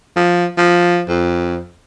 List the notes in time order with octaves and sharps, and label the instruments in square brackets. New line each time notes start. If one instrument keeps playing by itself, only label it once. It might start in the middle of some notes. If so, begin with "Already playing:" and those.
[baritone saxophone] F3
F3
F2